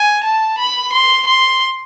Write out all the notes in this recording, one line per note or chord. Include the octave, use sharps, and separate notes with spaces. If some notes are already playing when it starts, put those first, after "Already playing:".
Already playing: G#5
A5
B5
C6
C6